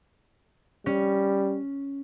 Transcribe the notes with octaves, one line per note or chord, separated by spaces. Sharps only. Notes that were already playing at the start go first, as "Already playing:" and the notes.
G3 C#4